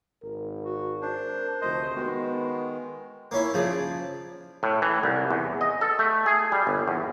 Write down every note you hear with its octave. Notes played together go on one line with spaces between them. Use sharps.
G#1 A#4
F#4
D4 C5
F1 D2 C5 D#5
D#3 G#3 B3 F#4
A#3 C#4 E4
C#3 F3 G#4 D5
A2
E3
C2
E2
D#5
A4
A3
G#4
G3
G1
E2